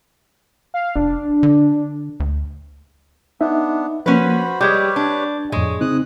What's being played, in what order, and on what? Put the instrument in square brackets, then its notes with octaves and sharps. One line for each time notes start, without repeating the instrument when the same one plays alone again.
[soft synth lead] F5
[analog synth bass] F1 [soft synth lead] D4
[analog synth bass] D3
D2
[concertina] B3 D4 [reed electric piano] D#4 E5
[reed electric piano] F3 A#3 [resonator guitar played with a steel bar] C#4 B4 [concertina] F#4 C5 B5
[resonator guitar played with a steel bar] G3 G#3 [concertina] G4 B4 C#5 [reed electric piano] D6 G6 G#6
[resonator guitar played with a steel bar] D4
[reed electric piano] F2 A2 [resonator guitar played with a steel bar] G#3 [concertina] C#5
[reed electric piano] C#3 C4 D#4 [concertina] D#6 F#6